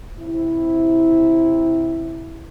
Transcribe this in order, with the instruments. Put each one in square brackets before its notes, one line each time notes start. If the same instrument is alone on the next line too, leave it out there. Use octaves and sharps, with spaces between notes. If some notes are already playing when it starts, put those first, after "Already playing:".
[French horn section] C3 E4